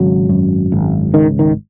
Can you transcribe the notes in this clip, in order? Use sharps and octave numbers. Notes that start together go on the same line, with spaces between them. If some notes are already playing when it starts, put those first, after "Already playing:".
Already playing: G#1 C#3 F#3
F#2
G#1
C#2 D#3
D#3